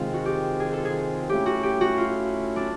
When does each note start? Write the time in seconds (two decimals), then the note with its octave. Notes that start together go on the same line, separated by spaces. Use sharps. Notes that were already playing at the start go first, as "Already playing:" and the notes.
Already playing: C3 D#3 G#3 C4 F4
0.14 F#4
0.26 G4
0.60 G#4
0.73 A4
0.85 G#4
1.28 A3 C#4 E4 G4
1.46 F#4
1.63 G4
1.81 F#4
1.98 F4
2.56 D4